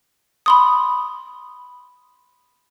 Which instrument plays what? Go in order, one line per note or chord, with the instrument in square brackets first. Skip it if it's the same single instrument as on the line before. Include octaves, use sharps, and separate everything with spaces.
[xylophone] B5 C6 D#6